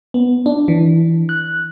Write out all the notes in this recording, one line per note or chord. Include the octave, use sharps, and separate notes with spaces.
B3
D4
E3
F#6